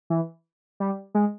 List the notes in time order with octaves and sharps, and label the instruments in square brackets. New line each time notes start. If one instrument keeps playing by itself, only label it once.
[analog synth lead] E3
G3
G#3